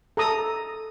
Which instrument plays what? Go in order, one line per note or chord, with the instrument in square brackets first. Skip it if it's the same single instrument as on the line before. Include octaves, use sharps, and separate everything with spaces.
[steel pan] A4 A#5 D#6